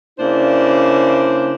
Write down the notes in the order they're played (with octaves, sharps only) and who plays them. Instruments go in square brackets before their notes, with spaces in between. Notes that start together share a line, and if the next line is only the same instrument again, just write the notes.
[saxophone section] C#3 A#3 D4 E4 C5